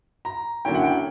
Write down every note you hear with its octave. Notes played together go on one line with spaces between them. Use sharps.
A#5
D3 F#3 A#3 C#4 E4 G5
F#5
G5